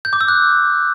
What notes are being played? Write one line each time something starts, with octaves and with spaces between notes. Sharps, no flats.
G6
D6
E6
F#6